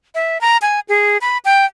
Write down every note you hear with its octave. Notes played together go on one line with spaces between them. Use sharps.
E5
A#5
G#5
G#4
B5
G5